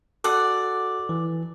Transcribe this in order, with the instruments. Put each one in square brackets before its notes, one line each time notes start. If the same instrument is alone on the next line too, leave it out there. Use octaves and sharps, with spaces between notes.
[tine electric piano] F#4 A4 [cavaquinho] D5 F#5
[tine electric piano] E3